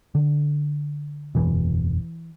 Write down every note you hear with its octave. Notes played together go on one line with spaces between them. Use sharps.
D3
F#1 E2 B2 E3